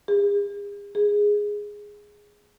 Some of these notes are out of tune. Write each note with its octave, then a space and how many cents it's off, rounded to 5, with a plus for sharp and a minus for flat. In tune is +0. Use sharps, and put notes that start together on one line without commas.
G#4 -45
G#4 -5